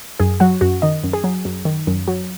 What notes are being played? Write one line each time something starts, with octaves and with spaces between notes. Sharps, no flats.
F#2 G#4
F#3 F#4
F#2 F#4
D#3 D#5
F#2
G#4
F#3
F#2
D#3
F#2
F#3